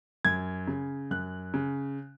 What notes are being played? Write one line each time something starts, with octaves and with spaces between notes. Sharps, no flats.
F#2 G#6
C#3
F#2 F#6
C#3